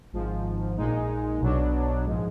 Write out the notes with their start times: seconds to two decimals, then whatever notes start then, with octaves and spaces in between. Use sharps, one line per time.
0.12 G#1 G#2 F3
0.77 A#1 A#2 G#3 D#4
1.40 B1 B2 F#3 D4
2.05 A#1 G#2 F3 G#3